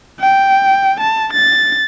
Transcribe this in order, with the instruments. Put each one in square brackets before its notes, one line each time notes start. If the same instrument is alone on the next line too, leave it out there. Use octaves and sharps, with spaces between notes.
[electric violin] G5
A5
A6